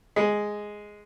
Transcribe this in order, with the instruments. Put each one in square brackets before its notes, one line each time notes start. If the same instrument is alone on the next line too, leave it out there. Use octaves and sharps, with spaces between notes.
[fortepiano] G#3